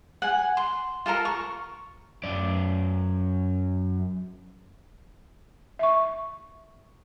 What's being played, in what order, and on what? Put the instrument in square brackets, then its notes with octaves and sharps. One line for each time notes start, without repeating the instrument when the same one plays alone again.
[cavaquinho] F#5 G#5
C6
F4 A4 A#4 A#5
C#6
[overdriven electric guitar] F#2 D5
[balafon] E5 C#6